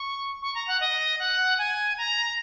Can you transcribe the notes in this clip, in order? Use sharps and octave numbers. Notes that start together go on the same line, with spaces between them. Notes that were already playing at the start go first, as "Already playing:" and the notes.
Already playing: C#6
C#6
A#5
F#5
D#5
F#5
G#5
A#5